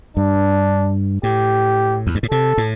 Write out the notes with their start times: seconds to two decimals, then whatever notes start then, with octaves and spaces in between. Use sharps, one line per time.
0.17 G2 D4
1.23 A2 G4
2.07 E2
2.15 G2
2.23 A2
2.31 C3 A4
2.58 A2